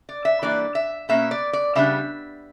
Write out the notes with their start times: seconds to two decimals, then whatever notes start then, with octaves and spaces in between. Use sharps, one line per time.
0.09 D5
0.25 E5
0.42 E3 G3 A#3 D4 D5
0.75 E5
1.09 B2 A#3 C#4 E5
1.31 D5
1.53 D5
1.75 C#3 G3 B3 D4 E5